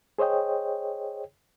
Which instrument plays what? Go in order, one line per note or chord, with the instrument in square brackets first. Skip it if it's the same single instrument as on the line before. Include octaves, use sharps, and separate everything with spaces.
[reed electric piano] G#4 C5 C#5 D#5 G5